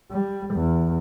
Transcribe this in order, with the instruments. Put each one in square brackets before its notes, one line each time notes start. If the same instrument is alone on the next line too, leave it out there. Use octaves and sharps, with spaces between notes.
[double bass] G3
E2